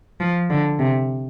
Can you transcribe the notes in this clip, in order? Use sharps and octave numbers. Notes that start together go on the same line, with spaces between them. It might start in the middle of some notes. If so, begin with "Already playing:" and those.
F3
D3
C3